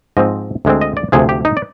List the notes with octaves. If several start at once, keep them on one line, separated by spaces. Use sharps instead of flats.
G#2 F3 C4 D#5
D2 D3 G#3 C4
D#5
D5
D2 C3 F3 G#4
G4
D#4
D5